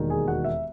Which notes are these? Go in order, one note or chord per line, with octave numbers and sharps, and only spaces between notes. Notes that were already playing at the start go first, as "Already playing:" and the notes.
Already playing: E1 D#2 D#3
G#4 G#5
F#4 F#5
E5